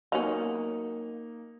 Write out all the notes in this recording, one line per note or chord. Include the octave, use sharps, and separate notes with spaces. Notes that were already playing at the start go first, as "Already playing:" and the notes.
F#3 A#3 B3 C#4 D#4 F7